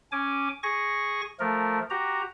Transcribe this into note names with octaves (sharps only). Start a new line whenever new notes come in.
C#4 G#5 D6
G#4 G#5 C#6 A#6
F3 A3 A#4
F#4 G4 A#5